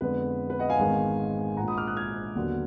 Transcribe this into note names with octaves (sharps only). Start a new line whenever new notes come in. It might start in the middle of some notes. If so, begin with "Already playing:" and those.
F2 D3 G#3 B3 B4
B4
D#5 F#5
F5 G#5
G#1 G#2 D#3 G#3 B3
A#1 G#2 F3 A#3 F#5 A#5
B5 D#6
D6 F6
D#6 F#6
F6 G#6
D#2 D3 F#3 B3